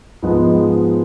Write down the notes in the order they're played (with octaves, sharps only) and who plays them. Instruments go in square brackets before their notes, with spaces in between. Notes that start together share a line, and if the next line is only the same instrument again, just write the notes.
[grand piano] G#2 F3 G#3 B3